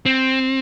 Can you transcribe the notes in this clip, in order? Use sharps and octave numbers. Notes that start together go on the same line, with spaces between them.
C4